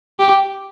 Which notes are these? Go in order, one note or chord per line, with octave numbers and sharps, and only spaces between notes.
G4